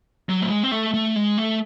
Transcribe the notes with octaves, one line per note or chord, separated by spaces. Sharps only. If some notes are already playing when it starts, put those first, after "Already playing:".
F#3
A3
G#3
C4
A3
A3
G#3
A3